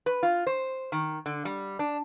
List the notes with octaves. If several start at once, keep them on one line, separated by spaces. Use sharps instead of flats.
B4
F4
C5
D#3
D3
G3
D4